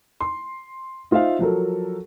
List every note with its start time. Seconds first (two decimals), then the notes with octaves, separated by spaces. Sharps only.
0.20 C6
1.11 D#4 F4 C5 E5 F5
1.39 F3 F#3 A4 A#4